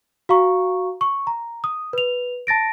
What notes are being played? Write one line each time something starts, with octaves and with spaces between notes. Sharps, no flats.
F#4 F5 A#5 C#6
C#6
A#5
D#6
B4 F7
A5 A6 A#6 D7